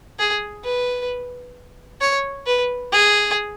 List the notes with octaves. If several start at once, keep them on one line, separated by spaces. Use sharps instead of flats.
G#4
B4
C#5
B4
G#4